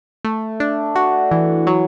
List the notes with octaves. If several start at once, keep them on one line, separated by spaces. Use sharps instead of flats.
A3
D4
F#4
E3
F#3